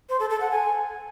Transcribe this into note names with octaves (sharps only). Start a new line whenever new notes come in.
C5
A4
A4
F#5
G#5